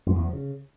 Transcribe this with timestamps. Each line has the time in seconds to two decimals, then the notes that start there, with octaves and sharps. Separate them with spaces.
0.06 F#2
0.15 E2
0.24 F3
0.33 C#3